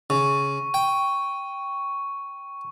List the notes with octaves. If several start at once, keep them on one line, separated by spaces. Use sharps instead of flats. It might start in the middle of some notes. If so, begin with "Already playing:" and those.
C#3 C#6
G5